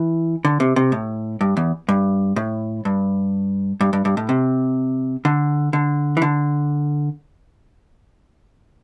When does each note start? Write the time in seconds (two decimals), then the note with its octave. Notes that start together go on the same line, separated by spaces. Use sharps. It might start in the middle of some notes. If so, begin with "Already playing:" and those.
Already playing: E3
0.45 D3
0.60 C3
0.76 C3
0.92 A2
1.41 G2
1.57 E2
1.89 G2
2.36 A2
2.85 G2
3.81 G2
3.93 G2
4.05 G2
4.17 A2
4.29 C3
5.25 D3
5.73 D3
6.17 E3
6.22 D3